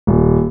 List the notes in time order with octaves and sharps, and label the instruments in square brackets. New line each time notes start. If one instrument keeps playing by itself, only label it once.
[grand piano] D#1